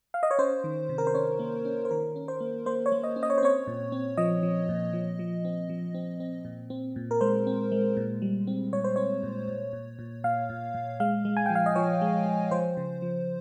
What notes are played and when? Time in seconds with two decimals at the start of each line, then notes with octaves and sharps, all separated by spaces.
0.14 F5
0.23 D#5
0.31 C#5
0.38 C#4 C5
0.64 D#3
0.89 C3
0.98 A#4
1.07 C5
1.14 C#4 C#5
1.39 A#3
1.65 C#4
1.85 C5
1.91 D#3 A#4
2.16 C#4
2.28 C5
2.41 A#3
2.66 A#3 C5
2.86 C#5
2.92 A#3
3.04 D#5
3.16 C#4
3.23 D#5
3.30 C#5
3.38 C5
3.43 C4 C#5
3.67 A#2
3.92 C4
4.17 F3 D#5
4.43 F3
4.69 A#2
4.93 F3
5.19 F3
5.45 C4
5.69 F3
5.94 C4
6.20 C4
6.45 A#2
6.70 C4
6.96 A#2
7.11 A#4
7.21 G#3 C5
7.47 C4
7.72 G#3
7.97 A#2
8.22 G3
8.47 C4
8.73 A#2 C#5
8.84 C5
8.96 C4 C#5
9.23 A#2
9.48 A#2
9.73 A#2
9.99 A#2
10.24 A#2 F5
10.50 A#2
10.74 A#2
11.00 G#3 F5
11.25 G#3
11.37 G#5
11.46 F3 G5
11.55 F5
11.66 D#5
11.76 F3 C#5
12.01 G#3
12.26 G#3
12.51 F3 C5
12.77 C#3
13.02 F3